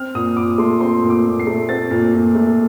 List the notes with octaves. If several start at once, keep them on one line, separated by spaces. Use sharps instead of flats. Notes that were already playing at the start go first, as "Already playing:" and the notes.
Already playing: C4 F6
A#2 D#6
A#2 D6
A3 C6
C4 C6
A#2
D6
A#2
C7
A3
C4 A6
A#2
A#2
A3